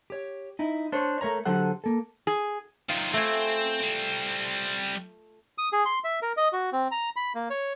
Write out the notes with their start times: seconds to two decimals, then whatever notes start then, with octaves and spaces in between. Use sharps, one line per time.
0.10 G4 C#5
0.59 D#4 E4
0.92 D4 C5 C#5
1.21 A3 A#4 C#5 A#5
1.45 D3 F#3 G4 A4 C5 F#5
1.84 A#3 A4
2.27 G#4
2.89 D#3 F#3 F4
3.13 A3 C4 G#5
3.80 G3 C4
5.58 D#6
5.73 G#4
5.86 C6
6.04 E5
6.22 A#4
6.37 D#5
6.53 F#4
6.73 C4
6.91 A#5
7.16 B5
7.35 A#3
7.50 C#5